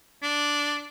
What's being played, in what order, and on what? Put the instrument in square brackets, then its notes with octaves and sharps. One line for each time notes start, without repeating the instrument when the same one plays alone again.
[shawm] D4